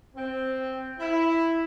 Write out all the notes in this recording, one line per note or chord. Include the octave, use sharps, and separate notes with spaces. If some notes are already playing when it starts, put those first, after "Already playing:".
C4
E4